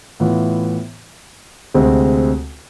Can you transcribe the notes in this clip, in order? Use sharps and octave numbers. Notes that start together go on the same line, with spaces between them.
A2 E3 B3 F4
D2 C3 G#3 C4